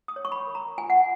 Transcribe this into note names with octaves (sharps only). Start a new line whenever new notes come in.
D#6
C#5
C#6
B5
A#4
A#5
F4 G#5
F#5